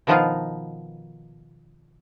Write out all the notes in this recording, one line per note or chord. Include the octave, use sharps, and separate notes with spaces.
B2 D#3 F3 B3 D#4 F4